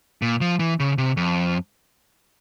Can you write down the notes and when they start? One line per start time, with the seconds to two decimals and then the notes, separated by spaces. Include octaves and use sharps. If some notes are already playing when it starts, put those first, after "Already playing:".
0.22 A#2
0.41 F3
0.60 E3
0.80 C#3
0.98 C3
1.17 F2